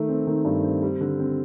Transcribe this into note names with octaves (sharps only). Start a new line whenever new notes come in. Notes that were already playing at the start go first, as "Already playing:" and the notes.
Already playing: D#3 A3
C4
D#3
G2
C4
G3
D3
C4